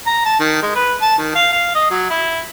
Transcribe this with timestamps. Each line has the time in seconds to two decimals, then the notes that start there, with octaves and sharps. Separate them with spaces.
0.06 A#5
0.25 A5
0.40 D#3
0.62 G#3
0.75 B4
1.01 A5
1.18 D#3
1.35 F5
1.52 F5
1.75 D#5
1.90 F#3
2.09 E4